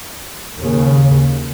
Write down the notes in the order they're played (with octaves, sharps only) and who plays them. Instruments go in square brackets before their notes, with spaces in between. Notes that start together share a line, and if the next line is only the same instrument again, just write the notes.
[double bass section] D#2 C#3